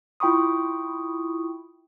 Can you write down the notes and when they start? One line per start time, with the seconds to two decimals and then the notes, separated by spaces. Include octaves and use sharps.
0.20 E4 F4 G5 B5 C#6 D#6